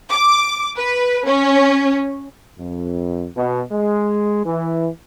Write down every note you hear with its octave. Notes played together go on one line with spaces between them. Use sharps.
D6
B4
C#4
F2
B2
G#3
E3